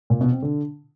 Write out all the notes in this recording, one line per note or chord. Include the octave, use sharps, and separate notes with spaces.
A#2
B2
C4
D3